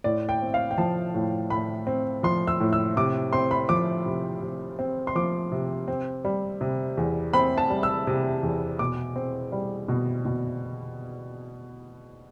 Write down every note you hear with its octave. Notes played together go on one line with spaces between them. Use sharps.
A2 D5
G5
C4
F5
G5
F3 A5
A2
A2 B5
C4
F3 C6
E6
A2
E6
C3 D6
C4 C6
B5
F3 D6
C3
C3
C4
C6
F3 D6
C3
C4
G3
C3
E2
C4 B5
A5
G3
E6
C3
E2
B2 D6
C4
G3
B2
B2